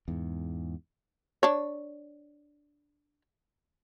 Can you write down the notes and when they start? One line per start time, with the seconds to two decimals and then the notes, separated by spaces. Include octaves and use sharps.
0.08 E2 G#2
1.43 D4 C#5